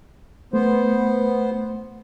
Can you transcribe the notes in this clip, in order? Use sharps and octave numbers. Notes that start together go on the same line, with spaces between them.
A3 B3 C5